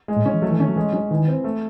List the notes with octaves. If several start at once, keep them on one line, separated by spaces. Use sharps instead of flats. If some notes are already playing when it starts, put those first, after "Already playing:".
G#3
A2
C#3 C#4
E3
F#3 A3
E3
D#3 C#4
F#3
E3 G#3
F#3 C#4
D#3 E3
C4
A3